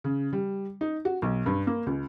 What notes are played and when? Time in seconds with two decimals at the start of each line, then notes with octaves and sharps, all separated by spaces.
0.04 C#3
0.33 G3
0.81 D#4
1.05 F#4
1.22 B1
1.46 G2
1.67 A#3
1.86 C#2